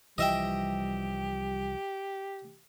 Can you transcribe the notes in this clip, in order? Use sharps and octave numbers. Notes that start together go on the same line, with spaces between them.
C2 E3 F3 G3 G4 D#5 E5 G5